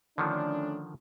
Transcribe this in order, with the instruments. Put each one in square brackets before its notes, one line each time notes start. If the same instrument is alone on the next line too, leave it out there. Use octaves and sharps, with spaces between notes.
[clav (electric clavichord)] D3 D#3 F3 [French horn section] A3 C#4 D4